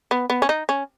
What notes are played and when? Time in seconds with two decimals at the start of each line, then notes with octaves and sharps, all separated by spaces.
0.11 B3
0.30 B3
0.42 C#4
0.49 D#4
0.69 C#4